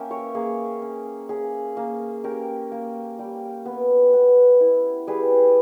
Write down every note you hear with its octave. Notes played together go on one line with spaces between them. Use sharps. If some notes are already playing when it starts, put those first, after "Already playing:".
Already playing: A#3 C#4 E5 G5
A#4 C#5
A#3 G#4
C#4
C#4 G#4
A#3
C#4 G4 A#4
A#3
G3
B3
B3
E4
G3 G#4 B4